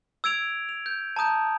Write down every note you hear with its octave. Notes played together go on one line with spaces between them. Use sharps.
E6 G#6 D7 F7
F7
G6
A5 A#5 D#6 G6